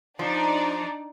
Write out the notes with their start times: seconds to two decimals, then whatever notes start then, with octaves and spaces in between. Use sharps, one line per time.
0.19 F3 D4 D#4 D5